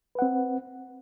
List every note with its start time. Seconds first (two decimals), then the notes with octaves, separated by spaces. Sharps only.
0.15 B4
0.19 F#5
0.22 C4